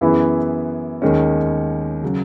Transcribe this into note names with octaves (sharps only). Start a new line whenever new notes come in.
F#2 E3 B3 E4 G#4
D#2 D#3 G#3 C#4
C#3 F#3